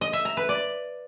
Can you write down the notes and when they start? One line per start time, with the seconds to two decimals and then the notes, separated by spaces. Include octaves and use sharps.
0.01 D#5
0.13 E5
0.25 A#5
0.37 B4
0.49 D5